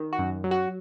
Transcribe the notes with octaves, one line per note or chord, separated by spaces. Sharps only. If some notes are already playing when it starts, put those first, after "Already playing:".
Already playing: D#3
F#4
F#2
F#3
F#4